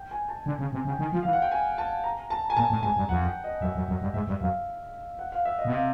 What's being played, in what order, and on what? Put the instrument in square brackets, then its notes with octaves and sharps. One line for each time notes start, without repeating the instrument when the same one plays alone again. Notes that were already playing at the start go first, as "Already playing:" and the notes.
Already playing: [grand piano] G5
G#5
A5
[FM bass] D3
C#3
C3
C#3
[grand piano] G5
[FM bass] D#3 [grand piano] G#5
[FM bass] F3
[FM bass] E3 [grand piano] F5
[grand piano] F#5
G5
G#5
A5
A#5
A5
G#5
[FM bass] A#2 [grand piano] A5
[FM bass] A2
[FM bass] G#2 [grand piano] G#5
[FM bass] G2
[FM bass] F2 [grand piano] F#5
[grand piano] G5
D#5
[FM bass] F#2 [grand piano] E5
[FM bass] F#2
F#2
G2
[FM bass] G#2 [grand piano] E5
[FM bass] G2
[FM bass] F#2 [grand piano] F5
[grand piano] F#5
F5
E5
D#5
[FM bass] B2
[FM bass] C3 [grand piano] F5